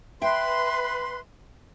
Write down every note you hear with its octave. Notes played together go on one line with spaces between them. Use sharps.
B4 E5 G5 C6